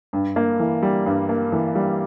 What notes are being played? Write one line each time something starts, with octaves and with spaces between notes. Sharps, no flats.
G2
A#3
E3
G3
G2
A#3
E3
G3